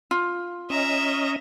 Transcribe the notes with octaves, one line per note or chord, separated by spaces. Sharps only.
F4
C#4 D#5 E5 A#5